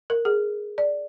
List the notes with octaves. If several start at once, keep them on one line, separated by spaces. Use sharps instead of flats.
A#4
G#4
D5